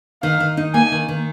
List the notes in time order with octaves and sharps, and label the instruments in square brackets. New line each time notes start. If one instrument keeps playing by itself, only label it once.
[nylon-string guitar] D#3 [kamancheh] F5
[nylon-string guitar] D#3
D#4
[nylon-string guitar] A#3 [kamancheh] G#5
[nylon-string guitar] D#3
D#3